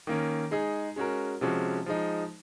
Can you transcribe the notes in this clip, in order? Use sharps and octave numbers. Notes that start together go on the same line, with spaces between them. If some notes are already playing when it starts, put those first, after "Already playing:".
D#3 A#3 C#4
G#3 D#4 G#4
G#3 C#4 F#4 A#4
C3 F3 G#3 C#4 F#4
F3 G#3 D#4